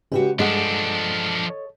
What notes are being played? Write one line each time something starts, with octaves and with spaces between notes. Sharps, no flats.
C#3 G#3 F#4 G4 B4
G2 F3 G#3 D4 A4 D#5 F#5
C#5